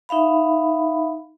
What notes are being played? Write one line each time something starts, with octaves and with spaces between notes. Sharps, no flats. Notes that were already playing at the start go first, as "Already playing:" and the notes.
D#4 E5 F5 B5